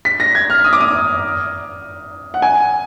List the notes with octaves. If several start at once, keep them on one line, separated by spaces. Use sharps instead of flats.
B6
A#6
G#6
F6
D#6
D6
D#6
F#5
G#5